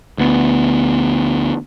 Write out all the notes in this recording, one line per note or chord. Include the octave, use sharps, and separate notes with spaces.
D2 B3